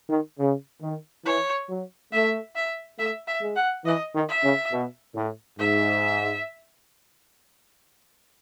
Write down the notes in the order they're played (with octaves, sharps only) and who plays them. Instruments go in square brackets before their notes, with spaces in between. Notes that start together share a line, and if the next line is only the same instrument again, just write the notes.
[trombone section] D#3
C#3
D#3
[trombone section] E3 [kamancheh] C#5
[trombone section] F#3
[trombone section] A3 [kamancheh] E5
[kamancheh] E5
[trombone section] A3 [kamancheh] E5
[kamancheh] E5
[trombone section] G#3
[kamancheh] F#5
[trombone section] E3 [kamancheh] D#5
[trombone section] D#3
[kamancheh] E5
[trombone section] C#3
B2
A2
[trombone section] G#2 [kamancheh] E5